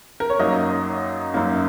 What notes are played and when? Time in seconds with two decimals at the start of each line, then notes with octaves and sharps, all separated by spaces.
0.20 A#4
0.30 C#5
0.39 F#2 F#3 A#3 D#4 D#5
1.34 F#2 F#3 A#3 D#4